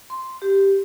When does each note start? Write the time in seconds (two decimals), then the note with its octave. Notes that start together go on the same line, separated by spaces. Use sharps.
0.10 C6
0.42 G4